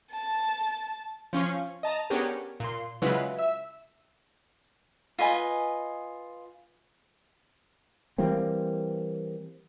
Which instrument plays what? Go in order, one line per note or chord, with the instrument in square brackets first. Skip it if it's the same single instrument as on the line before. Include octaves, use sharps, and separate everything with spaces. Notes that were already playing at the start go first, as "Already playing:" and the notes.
[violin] A5
[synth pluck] F3 C#4 F4 C#6
D#5 A5 A#5
B3 C#4 D4 G4 G#4 A#4
A#2 C6
C#3 F#3 G#3 E4 F4 B4
E5 E6
[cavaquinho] F4 B4 D#5 G#5
[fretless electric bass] E3 G3 A#3 C4